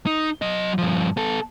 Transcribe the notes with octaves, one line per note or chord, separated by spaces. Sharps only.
D#4
F#3 D#5
G2 F3
B3 A4